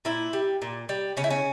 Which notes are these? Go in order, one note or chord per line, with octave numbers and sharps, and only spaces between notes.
A#2 E4
G3
A#2
G3
C#3 C#4
E4
C#4